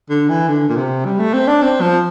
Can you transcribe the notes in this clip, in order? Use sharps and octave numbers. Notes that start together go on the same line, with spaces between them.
D3
E3
D3
A#2
C3
G3
A3
C4
D4
C4
F3